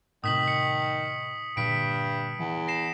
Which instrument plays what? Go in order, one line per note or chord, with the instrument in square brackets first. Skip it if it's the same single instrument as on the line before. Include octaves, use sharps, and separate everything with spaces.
[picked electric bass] A2 C3 [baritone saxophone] D#3 [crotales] D#6 B6 F#7
[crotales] B6 C#7
[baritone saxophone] G2 [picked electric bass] A#2 D3 [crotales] B6 D7
[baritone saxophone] E2 [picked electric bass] E3
[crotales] A#6 C7 E7